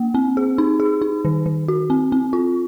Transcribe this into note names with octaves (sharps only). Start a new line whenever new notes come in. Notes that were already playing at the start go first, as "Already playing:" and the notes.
Already playing: A#3
C4
G#4
D#4
G#4
D#4
D#3
D#3
F#4
C4
C4
F4